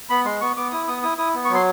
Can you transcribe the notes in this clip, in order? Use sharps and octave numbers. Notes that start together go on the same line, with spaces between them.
B3 B5
G#3 C6
B3 C#6
B3 D6
E4 D#6
B3 D#6
E4 D#6
E4 D#6
B3
C#6
F#3
C6